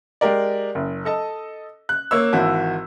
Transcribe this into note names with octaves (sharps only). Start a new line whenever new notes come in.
G#3 G4 A#4 D5
F#1
A4 D#5 A5
F#6
A#3 C#5 E6
G#1 E3 F#4 A5